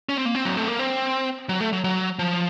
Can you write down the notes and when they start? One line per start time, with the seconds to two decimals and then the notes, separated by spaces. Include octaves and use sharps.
0.09 C#4
0.18 C4
0.25 A#3
0.35 C4
0.45 F#3
0.57 A3
0.68 A#3
0.79 C4
1.49 F#3
1.61 A3
1.73 F#3
1.84 F#3
2.19 F3